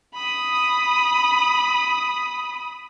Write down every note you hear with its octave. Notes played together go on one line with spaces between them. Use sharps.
B5 D#6